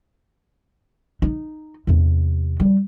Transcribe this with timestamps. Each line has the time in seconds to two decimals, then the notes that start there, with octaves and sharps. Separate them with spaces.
1.22 D#4
1.87 E2 C3
2.60 G3